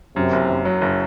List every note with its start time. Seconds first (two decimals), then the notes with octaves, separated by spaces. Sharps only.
0.16 F#2 C3
0.33 F#1
0.50 F#1
0.65 F#3
0.81 F#1